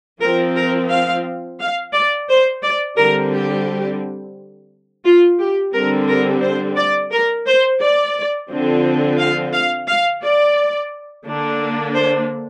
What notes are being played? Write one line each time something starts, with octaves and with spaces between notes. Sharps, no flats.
F3 C4 A#4
A#4
F5
F5
D5
C5
D5
D3 G3 C4 A#4
G4
F4
G4
D3 G3 C4 A#4
A#4
C5
D5
A#4
C5
D5
D3 F3 C4
F5
F5
F5
D5
D3 A#3 D4
C5